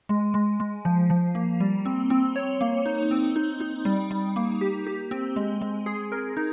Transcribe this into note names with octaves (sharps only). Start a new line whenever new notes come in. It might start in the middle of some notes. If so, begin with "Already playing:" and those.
G#3
G#3
G#3
F3
F3
A#3
G3
C4
C4
C#5
A#3
D#4
C4
D#4
D#4
G3
G3
A#3
G4
G4
C4
G#3
G#3
G#4
A#4
D#4